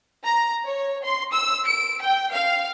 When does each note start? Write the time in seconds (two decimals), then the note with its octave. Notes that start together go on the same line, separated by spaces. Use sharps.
0.24 A#5
0.65 C#5
1.04 C6
1.33 E6
1.67 D7
2.04 G5
2.33 F5